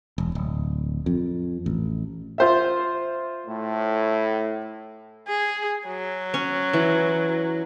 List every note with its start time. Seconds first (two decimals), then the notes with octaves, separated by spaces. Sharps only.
0.18 E1
0.35 D1
1.06 F2
1.66 A1
2.38 F4 C5 E5
3.47 A2
5.28 G#4
5.87 F#3
6.34 C#4
6.73 E3